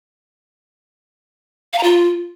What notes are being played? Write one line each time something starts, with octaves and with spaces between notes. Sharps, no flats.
F5
A#5
F4